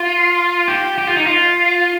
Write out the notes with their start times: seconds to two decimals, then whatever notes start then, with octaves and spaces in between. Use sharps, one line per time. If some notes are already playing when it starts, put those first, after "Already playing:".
Already playing: F4
0.68 G4
0.98 G4
1.07 F4
1.17 D#4
1.27 F4